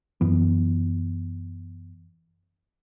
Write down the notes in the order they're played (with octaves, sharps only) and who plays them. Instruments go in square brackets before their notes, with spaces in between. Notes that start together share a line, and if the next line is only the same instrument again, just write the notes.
[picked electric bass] F#2 E3 B3